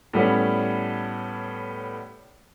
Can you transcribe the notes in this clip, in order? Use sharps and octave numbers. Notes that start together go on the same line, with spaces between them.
A2 G3 B3 C#4